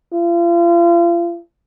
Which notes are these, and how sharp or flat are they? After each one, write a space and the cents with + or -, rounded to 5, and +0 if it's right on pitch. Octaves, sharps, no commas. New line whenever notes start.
F4 -35